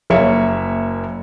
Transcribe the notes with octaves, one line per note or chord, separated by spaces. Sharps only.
F#1 A#3 C#5 E5 C#7